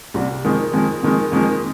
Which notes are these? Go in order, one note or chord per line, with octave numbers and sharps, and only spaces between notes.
C2 C3 G3
F2 D#3 G#3
F2 D#3 G#3
F2 D#3 G#3
F2 D#3 G#3